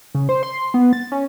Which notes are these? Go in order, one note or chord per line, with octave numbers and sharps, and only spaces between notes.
C#3
C5
C6
B3
A6
C#4